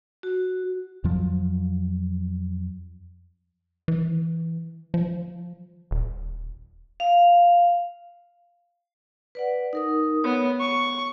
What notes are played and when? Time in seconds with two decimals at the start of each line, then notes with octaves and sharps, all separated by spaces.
0.23 F#4
1.04 F2 F3 F#3
3.88 E3
4.94 F3
5.91 D#1
7.00 F5
9.35 B4 D5 F#5
9.73 D#4 A#4 D#6
10.24 B3 C#5
10.60 C#6